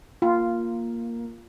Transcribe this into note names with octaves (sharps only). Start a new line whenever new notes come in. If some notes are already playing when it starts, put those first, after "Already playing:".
A#3 F4